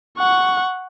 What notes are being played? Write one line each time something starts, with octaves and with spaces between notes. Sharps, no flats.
F#5 C#6